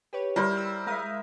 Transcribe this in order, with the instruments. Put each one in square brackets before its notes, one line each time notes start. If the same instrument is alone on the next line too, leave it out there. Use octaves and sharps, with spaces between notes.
[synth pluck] G4 B4 C#5
[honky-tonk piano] G3 [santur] E4 A#4 C5
[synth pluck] E6
[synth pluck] G#3 F5 D#6 [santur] A#4 E5